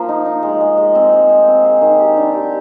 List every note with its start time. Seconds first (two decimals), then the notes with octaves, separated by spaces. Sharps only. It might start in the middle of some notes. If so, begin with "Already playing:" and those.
Already playing: F3 A#3
0.09 D#4
0.26 D#4
0.43 G#3
0.61 G#3
0.78 G#3
0.95 C4
1.13 G#3
1.29 C4
1.47 C4
1.64 G#4
1.82 D#3
1.99 G4
2.17 D4
2.34 G4